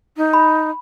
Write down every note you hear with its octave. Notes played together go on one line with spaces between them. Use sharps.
D#4
B5